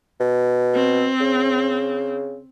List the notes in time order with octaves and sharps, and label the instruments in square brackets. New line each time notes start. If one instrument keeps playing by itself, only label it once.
[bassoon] B2
[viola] C4
[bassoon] C#3